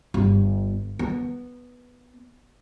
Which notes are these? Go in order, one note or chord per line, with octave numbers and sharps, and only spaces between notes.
G1
B3